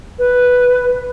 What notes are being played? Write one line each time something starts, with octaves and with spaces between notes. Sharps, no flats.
B4